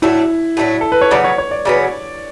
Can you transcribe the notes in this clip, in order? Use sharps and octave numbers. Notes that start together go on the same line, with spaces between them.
A2 F#3 A3 D4 E4
A2 F#3 A3 D4
A4
B4
C#5
C#3 F#3 B3 D5
C#5
C#5
D5
C#3 F#3 B3 D5